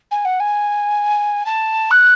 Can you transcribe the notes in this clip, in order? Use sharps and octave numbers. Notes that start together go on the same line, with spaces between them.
G#5
F#5
G#5
A5
F#6